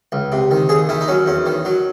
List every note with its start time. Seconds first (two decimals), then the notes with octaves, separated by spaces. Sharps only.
0.12 C#2
0.32 C3
0.51 D#3
0.69 D#2 G#4
0.89 D#3 E4
1.01 D#4
1.08 F#3 C#4
1.26 E2 C#4
1.46 D#3
1.65 F#3